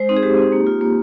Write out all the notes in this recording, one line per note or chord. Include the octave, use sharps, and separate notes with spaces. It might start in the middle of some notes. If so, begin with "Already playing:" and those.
Already playing: G#3 C5
C4 D#4
G#4
G#3 G4
C4 D#4
A#3
F4
A#3